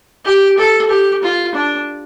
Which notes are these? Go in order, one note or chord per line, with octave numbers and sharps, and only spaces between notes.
G4
A4
G4
F4
D4